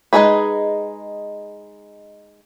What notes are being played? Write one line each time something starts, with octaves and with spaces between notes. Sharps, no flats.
G#3 A3 D#4 G#4 B4